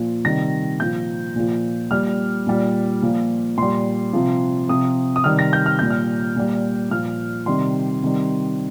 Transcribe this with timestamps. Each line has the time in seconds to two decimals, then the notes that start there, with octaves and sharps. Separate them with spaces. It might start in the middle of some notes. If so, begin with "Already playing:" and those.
Already playing: A#2 F3
0.25 C3 D#3 G3 A#6
0.80 A#2 F3 G6
1.36 A#2 F3
1.91 A#2 G3 F6
2.47 A#2 G3
3.02 A#2 F3
3.58 A#2 G3 C6
4.13 C3 F3
4.69 C3 F3 D#6
5.16 D#6
5.24 C3 D#3 G3 F6
5.39 A#6
5.53 G6
5.66 F6
5.79 A#2 G3 G6
5.90 F6
6.36 A#2 G3
6.91 A#2 F3 F6
7.46 C3 D#3 G3 C6
8.03 C3 D#3 G3